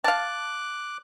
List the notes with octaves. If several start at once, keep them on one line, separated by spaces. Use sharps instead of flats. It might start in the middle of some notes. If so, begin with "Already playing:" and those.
F5 A5 D6 F#6